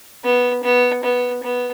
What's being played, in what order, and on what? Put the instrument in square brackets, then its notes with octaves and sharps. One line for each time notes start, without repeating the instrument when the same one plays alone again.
[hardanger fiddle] B3
B3
B3
B3